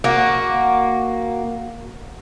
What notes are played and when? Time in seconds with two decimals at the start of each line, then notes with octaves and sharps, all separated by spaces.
0.04 A#3 F#4